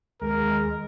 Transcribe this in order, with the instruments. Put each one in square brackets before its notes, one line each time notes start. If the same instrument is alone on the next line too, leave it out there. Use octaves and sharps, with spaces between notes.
[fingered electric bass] D#2 [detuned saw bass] G#3 [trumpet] A#4